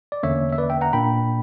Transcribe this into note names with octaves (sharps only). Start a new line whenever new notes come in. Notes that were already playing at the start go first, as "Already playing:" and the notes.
D5
E2 D3 A#3 C#4 C#5 E5
E5
B4 D5
E5 G5
F#5 A#5
A#2 A#3 D4 G5 B5